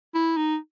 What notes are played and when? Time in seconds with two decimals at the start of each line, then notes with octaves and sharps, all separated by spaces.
0.15 E4
0.37 D#4